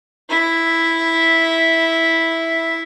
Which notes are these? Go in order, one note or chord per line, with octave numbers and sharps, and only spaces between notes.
E4 E5